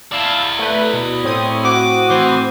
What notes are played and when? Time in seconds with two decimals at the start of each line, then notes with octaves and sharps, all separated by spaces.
0.12 E4 D5 F5 A5 E6
0.59 A3 B4
0.93 B2
1.24 A2 C4 C5 C#5 D#6
1.65 F#4 D6
2.10 E3 C5